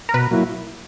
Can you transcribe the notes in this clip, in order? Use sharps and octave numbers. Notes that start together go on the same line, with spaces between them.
A#4
B2 B4
F#3 A#3 E4